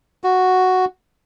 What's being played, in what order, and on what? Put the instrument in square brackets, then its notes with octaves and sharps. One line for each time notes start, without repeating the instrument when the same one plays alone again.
[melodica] F#4